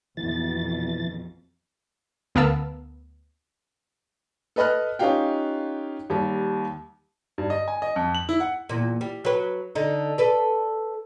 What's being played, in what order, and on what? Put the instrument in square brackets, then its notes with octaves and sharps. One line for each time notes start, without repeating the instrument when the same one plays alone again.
[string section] A#1 F2 B2 [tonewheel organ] E3 A6
[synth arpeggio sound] D2 B3 A#4 F5 A5 E6
[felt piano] A4 B4 D#5 B5 F6 F#6
C#4 D#4 F4 G4 F5 G5
D#2 G3
[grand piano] G2
D#5
G#5
D#5
F2
F#7
E4
F#5
[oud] E2 A#2
G3
F#3 B4
D3 D#4
A4 B4 D5